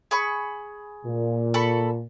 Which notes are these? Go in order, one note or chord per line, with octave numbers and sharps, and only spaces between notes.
G#4 B5 C#6
A#2
A4 B5 C#6